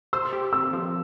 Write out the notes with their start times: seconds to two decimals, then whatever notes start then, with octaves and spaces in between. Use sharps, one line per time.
0.13 C5 E6
0.33 G4
0.53 C4 E6
0.73 F3